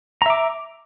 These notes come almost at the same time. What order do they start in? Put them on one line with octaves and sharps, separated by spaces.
A#5 E5 D6